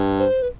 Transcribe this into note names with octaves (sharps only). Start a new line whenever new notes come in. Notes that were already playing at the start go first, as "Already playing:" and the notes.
Already playing: G2
C5
B4